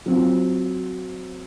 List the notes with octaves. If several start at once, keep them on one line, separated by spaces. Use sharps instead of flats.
F#3 C4 F4